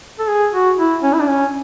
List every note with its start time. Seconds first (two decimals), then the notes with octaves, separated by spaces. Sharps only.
0.19 A4
0.28 G#4
0.53 F#4
0.78 E4
1.03 C#4
1.13 E4
1.20 D4
1.28 C#4